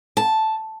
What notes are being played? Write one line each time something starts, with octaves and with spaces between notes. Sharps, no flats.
A5